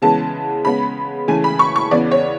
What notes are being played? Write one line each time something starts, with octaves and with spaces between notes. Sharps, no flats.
C#3 E3 G#3 B3 A5
C#3 G#3 B3 B5
C#3 E3 A3 G#5
B5
C#6
C#6
E2 C#3 E3 B3 D5
C#5